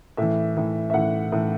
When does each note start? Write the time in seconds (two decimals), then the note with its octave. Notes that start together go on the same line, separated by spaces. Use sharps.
0.17 A2 E3 E5
0.57 A2 E3
0.90 E5
0.94 A2 E3 F#5
1.32 A2 E3